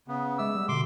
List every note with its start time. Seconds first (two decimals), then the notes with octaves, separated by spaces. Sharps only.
0.08 C#3 B3
0.38 G#3 E5 D6 E6
0.55 G3
0.68 B2 D3 C6 D6